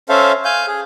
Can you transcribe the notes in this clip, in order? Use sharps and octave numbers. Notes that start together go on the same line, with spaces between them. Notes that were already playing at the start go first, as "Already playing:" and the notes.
C#4 A4 C5 E5 F5
F5 G#5 G6
G#4